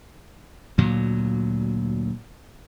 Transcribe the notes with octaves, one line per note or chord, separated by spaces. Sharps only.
D2 A#2 F#3